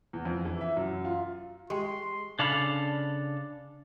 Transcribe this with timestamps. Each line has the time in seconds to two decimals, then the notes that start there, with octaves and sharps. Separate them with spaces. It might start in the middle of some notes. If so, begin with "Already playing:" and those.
0.13 E2
0.25 F2
0.45 E3
0.61 E5
0.77 F#2
1.05 F4
1.70 G#3 G4 G5 C6
2.39 C#3 D4 A4 F5 B5